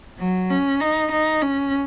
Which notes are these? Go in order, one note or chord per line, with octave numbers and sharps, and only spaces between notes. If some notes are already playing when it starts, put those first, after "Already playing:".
F#3
C#4
D#4
D#4
C#4